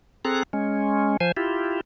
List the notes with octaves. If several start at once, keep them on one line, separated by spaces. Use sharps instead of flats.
C4 G#4 A4 A#5 F#6
G#3 C#4
F3 C5 G#5
E4 F4 G4